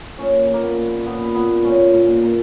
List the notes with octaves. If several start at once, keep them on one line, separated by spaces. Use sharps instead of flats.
A#2 C#4
A#2
A#3
B3
A#2
A#2 B3
A#2 B3
A#2 C#4
A#2
A#2